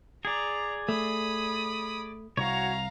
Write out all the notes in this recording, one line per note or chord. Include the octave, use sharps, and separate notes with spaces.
G#4 D5 A#5
A3 B5 D#6
C2 F#4 C#5 F5 A#5